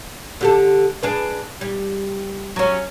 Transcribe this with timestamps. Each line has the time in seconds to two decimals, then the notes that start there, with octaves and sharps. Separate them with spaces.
0.41 D3 G4 A4
1.03 D4 G#4 B4
1.61 G3
2.56 F#3 C#4